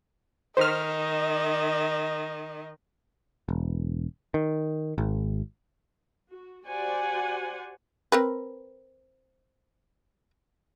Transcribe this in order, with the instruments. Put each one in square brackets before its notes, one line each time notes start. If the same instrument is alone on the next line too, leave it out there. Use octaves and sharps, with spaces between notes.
[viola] D#3 [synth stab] C5 F6 [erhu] D#5
[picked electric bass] E1
D#3
G#1
[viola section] F#4
F#4 G4 C5 D5 F#5 G#5
[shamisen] C4 A#4 B4